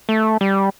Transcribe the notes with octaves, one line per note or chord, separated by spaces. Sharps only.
A3
G3